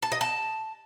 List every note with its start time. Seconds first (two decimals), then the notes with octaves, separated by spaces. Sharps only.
0.02 A5
0.12 D#5
0.21 A5